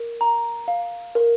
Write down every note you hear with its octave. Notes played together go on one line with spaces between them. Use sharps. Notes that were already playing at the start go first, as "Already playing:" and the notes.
Already playing: A#4
A#5
F5
A#4